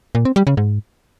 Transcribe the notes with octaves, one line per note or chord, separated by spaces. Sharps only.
A#2
C4
G3
C#3
G#2